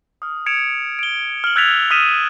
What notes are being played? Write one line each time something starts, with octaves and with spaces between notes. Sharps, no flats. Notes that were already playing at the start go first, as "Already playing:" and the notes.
D#6 F6
G#6 C#7 D7 E7 F7
D7 G7
F6 F#7
E6 F#6 G#6 A6 B6 F7
D#6 F6 B6 D#7 E7